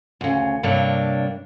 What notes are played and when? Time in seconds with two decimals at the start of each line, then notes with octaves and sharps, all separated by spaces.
0.21 D2 C#3
0.63 G2 C3 A#3 D4 C#5